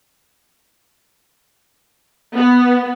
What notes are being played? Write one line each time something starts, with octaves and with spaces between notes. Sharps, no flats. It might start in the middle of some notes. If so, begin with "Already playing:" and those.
B3